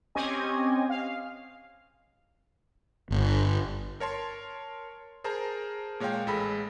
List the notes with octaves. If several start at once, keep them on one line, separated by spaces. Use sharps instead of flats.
C4 C#4 G4 D#5 G#5
F5
G1
A#4 C#5 A5 C6
G#4 A#4 C5 A5 A#5
A#2 G#3 C#5 F5 G5
A1 G#3 A4 B5